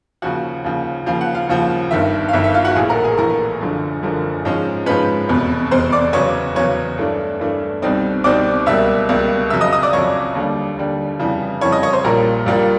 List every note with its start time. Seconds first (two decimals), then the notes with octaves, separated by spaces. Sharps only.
0.22 D#2 C#3 F3 F#4 F#5
0.64 D#2 C#3 F3
1.06 D#2 C#3 F3 F5
1.21 F#5
1.34 F4 F5
1.49 D#2 C#3 F3
1.91 G1 G2 D#3 E5
2.29 F5
2.33 G1 G2 D#3 E5
2.44 E5
2.54 F4 F5
2.65 F#4 F#5
2.75 A#1 A2 E3 G#4 G#5
2.89 A#4 A#5
3.04 G#4 G#5
3.18 A#1 A2 E3 A#4 A#5
3.60 F#1 F#2 D3 F3
4.03 F#1 F#2 D3 F3
4.45 G#2 F3 G#3 C#4
4.86 G#2 F3 G#3 C#4 B4 B5
5.29 F1 E2 B2
5.71 F1 E2 B2 C5 C6
5.92 D5 D6
6.13 E2 C#3 F#3 B3 C#5 C#6
6.55 E2 C#3 F#3 B3 C#5 C#6
6.98 G2 E3 A3 D4
7.39 G2 E3 A3 D4
7.82 C2 B2 G3 C4 D#4
8.24 C2 B2 G3 C4 D#4 D5 D6
8.66 C#2 B2 G3 A#3 E5 E6
9.09 C#2 B2 G3 A#3
9.50 F2 C#3 F#3 E5 E6
9.61 D#5 D#6
9.73 D#5 D#6
9.83 D5 D6
9.93 F2 C#3 F#3 C#5 C#6
10.35 D#2 D3 G3
10.77 D#2 D3 G3
11.20 F2 C#3 E3 G3
11.61 F2 C#3 E3 G3 C#5 C#6
11.72 D#5 D#6
11.83 C#5 C#6
11.93 C5 C6
12.04 A#1 A#2 G3 A#3 A#4 A#5
12.46 A#1 A#2 G3 A#3